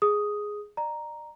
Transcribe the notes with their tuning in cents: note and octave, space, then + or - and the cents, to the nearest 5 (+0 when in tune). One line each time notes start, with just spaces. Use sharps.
G#4 +0 D#6 +0
D5 +35 A#5 +0